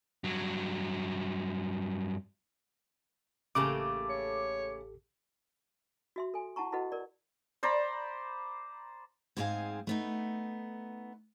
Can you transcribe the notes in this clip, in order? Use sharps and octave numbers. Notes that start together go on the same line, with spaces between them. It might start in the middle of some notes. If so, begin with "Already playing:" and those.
G2 F#3
A1 C#3 A3 A#3 G4 A4 D6
C#5
F#4 E5 C6
A4 G#5
E4 F#5 A5 A#5 C#6
E4 F#4 A4 B4 D#5 F#5
A#4 D5
C5 D5 A#5 B5
G#2 G#3 C4 F#4 F5 G#5
A3 B3 D#4